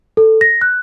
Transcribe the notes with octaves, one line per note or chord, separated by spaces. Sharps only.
A4
A#6
F#6